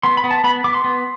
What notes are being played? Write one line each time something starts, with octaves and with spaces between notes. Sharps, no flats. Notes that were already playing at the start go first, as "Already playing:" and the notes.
B3 C6
B5
B3
A5
B3 B5
B3 D6
C6
B3